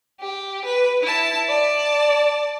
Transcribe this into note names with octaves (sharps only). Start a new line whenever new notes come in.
G4
B4
E4 A5
D5 A5